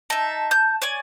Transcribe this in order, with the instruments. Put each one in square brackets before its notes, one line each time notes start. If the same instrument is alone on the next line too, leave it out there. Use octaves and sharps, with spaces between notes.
[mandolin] D#4 E5 [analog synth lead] A5
[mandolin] G6
C#5 D5 G#5